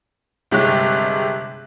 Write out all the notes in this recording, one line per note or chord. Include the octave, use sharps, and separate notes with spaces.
G1 C3 G#3 G4 C#5 F#6